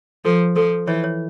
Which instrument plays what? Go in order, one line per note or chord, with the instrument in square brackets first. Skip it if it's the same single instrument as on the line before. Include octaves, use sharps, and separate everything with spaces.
[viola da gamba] F3 [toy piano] A4
[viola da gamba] F3 [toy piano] A4
[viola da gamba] E3 [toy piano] C#5
[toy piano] C#5